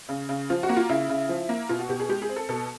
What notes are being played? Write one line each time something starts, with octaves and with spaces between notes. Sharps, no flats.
C#3
C#3
F3 F4
F#4
A#3
F4
C#3 E4
C#3
F3
A#3
B2 F4
F#4
B2 G4
G#4
G#3 G4
G#4
C4
A4
B2 A4